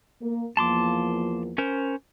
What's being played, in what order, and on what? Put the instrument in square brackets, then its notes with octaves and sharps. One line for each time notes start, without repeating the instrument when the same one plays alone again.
[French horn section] A#3 A#4
[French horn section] E2 F3 A#3 [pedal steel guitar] A5 C6 D6
[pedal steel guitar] C#4 A#4 C5